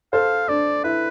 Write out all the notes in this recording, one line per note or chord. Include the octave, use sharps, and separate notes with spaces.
A4 C5 F5
D4 D5
E4 B4